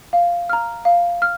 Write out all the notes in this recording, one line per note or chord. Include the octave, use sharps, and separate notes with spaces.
F5
A#5 F6
F5
F6